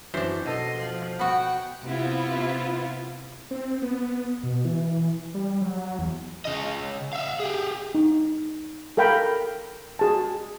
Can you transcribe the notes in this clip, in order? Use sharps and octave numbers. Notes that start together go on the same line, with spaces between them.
F#2 E3 D4 C5
B2 A4 D#5 C6
F3
B3 F#4 F#5 G5
C3 B3 E4 F4
C4
B3
B2
E3
G3
F#3
E2
C#3 D#5
E5 F5
G4 G#4
D#4
A4 A#4 F5 G5 A#5 B5
F#4 G#4 A5